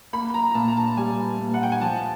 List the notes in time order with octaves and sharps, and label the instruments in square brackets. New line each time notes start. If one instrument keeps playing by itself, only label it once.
[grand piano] A#3 [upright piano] B5
[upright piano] A#5
A#5
[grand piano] A#2 [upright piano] A5
[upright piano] A#5
A5
[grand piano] G3 [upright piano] G#5
[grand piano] A#2
[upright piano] F#5
G5
G#5
[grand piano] F3 [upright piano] A5